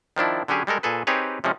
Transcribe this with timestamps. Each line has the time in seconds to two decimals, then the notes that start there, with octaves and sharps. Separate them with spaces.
0.16 D#3 F3 D4 E4
0.48 D3 F#3 C#4 G4 G#4
0.67 G3 G#3 A4 A#4
0.83 A#2 G#4 A4 B4
1.07 C4 D#4 G4 G#4 B4 C#5
1.44 C3 F3 G#3 C#4